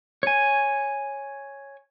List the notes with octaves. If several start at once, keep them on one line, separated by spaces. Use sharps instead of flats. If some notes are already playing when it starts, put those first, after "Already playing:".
C#5 G#5